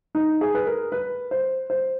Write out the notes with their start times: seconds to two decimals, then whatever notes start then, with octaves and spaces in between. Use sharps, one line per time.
0.15 D#4
0.41 G#4
0.55 B4
0.67 A#4
0.92 B4
1.31 C5
1.70 C5